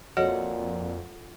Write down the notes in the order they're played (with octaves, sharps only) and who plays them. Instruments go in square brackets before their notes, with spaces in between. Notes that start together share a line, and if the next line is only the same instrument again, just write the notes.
[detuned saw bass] F2 [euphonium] A#2 [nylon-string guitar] F4 A4 F#5 [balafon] F#4 C#5 D#5